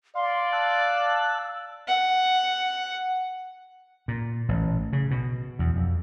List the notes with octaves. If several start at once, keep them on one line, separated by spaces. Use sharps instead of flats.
D5 F5 C6
A5 E6 F#6
F#5
A#2
A1
C#3
B2
E2
F2